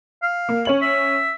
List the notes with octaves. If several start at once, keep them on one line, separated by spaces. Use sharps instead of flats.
F5
A#3
C#4 C#5 F#7
E5